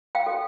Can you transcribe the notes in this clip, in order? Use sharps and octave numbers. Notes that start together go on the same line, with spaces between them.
F5 G5
F#4 A4 C#5